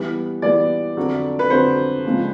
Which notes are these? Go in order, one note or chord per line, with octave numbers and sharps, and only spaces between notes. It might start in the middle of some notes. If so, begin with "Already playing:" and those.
Already playing: E3 G3 B3
E3 G3 B3 D5
F2 D3 F#3
B4
F2 D3 F#3 C5
D#2 C#3 F3 G#3 C4